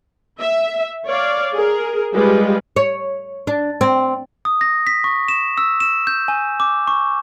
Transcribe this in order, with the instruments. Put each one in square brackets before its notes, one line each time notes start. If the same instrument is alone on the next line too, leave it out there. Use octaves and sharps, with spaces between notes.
[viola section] E5
C#5 D5 F5
G#4 A#4
G3 G#3 F4 G4 B4
[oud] C#5
D4
C4
[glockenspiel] D#6
A#6
B6
C#6
E7
E6
E7
G6
G#5
D6
C#6